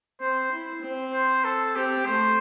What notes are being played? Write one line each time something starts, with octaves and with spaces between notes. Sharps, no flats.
C4 C5
E4
C4
C5
A4
C4 G4
A3 C5